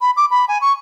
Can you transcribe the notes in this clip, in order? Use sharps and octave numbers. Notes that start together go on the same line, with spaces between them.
B5
D6
B5
G#5
C#6